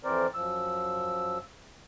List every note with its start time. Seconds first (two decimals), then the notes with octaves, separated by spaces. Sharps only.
0.04 F2 E3 C4 A#4 C5 D5
0.34 F#2 F3 E6